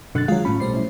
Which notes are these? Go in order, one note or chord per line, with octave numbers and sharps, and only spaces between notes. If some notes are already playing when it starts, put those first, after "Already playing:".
F#2 B2 D3 F#6 A6
D#3 F#3 G#3 F4 F#4 G#4 F5
A2 A3 C#4 B5
B1 G3 A3 C5 C7
C#4 E4